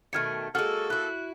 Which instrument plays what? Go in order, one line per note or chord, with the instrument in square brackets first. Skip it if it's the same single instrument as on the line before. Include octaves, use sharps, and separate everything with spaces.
[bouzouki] B2 D#3 A3 [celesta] F6 G#6 C#7
[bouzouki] G#3 F#4 [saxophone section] A#3 G#4 A4 [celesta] F6
[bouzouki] E4 F#4 [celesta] F#6